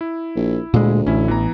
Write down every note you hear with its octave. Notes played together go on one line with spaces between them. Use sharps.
E4
A#1
D2 A#2 G#3
A1 C#4 E4
E3 B3 A#5